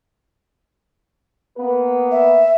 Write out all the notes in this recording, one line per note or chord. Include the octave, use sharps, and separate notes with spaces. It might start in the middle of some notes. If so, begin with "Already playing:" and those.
A#3 B3 B4
E5